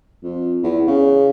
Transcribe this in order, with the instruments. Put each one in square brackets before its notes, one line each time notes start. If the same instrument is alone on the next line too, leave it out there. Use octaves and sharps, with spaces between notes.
[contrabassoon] F2
E2
C#3